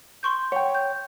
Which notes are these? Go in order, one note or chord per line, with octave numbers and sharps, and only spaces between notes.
C6 C#6 G6
C#5 F#5 G5
G6